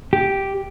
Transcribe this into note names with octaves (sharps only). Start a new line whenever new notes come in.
G4